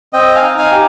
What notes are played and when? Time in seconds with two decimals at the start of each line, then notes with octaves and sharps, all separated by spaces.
0.13 C4 D#5 G5
0.35 F5 G#5
0.42 D#4
0.57 F5 G#5
0.72 G4